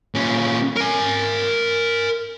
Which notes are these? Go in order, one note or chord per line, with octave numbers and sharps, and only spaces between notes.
A#2 C#4
A#4 G#5